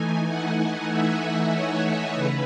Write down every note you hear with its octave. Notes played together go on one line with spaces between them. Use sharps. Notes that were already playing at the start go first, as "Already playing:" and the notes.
Already playing: E3 A3 D#4 G#5
F#5
E5
C#5
C#3 B4